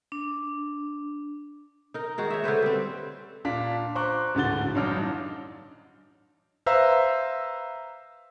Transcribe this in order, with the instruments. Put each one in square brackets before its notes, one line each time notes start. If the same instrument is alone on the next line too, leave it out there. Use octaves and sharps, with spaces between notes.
[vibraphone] D4
[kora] D#4 A#4
D#3 G#3 F#4
C#5 E5
D3 C#4 B4 C5
G3 C4
[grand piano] A#2 D4 F5 B6
C5 A#5 C#6 D6 F#6
D1 G#2 D3 F#4 A6 G7
A1 G2 F#3 D4 D#4 F6
[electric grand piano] B4 C5 E5 F5 A#5 E6